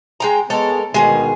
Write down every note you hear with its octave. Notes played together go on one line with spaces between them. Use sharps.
G#3 G5 A#5
G#3 B3 A4 A#4 C#5
D2 B2 D#3 G#3 G#4